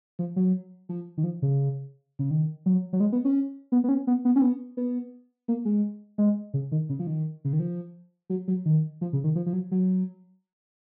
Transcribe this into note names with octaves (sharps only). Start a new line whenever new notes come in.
F3
F#3
F3
D#3
F3
C#3
C#3
D#3
F#3
F#3
G#3
B3
C#4
B3
B3
C#4
B3
B3
C#4
B3
B3
A#3
G#3
G#3
C#3
D#3
C#3
F3
D#3
C#3
D#3
F3
F#3
F#3
D#3
F3
C#3
D#3
F3
F3
F#3
F#3